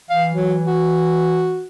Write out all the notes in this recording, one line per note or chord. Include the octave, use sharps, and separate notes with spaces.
E3 F5
F#3
F#4